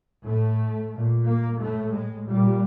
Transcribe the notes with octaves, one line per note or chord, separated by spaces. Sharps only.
A2 A3
A#2
A#3
A2 A3
G#3
A#2 G3